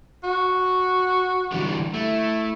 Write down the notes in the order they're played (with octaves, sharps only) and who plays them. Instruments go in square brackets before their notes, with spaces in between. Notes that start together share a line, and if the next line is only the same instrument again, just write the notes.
[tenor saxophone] F#4
[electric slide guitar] D3 E3 G3
[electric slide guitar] A3 [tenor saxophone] E4